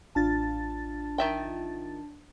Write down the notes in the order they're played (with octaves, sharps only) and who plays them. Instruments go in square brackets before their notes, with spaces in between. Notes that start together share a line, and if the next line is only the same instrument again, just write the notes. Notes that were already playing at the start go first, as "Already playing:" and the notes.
[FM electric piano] A1 F4 A6 [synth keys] D4 A5
[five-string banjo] D#3 E5 G5